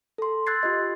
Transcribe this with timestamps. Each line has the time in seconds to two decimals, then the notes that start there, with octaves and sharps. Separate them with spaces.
0.18 A4 C6
0.47 C6 E6 F#6 G#6 A6 C7
0.63 F4 G4 D#5